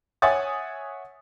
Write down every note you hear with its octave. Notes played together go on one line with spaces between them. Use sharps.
C#5 E5 F#5 G#5 D#6 A6